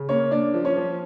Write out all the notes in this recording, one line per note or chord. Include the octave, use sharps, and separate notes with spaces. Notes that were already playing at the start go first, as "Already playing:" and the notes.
Already playing: C#3
A#3 C#4 C#5
A#3 D4 D5
F3
C#4 C#5
F3